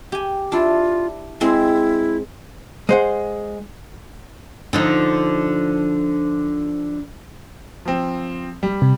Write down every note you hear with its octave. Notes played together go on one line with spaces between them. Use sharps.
G4 G#5
D4 E4 F4
G#3 C4 E4
G#3 C5 F#5
D3 F3 D#4
F3 C4
G3
C3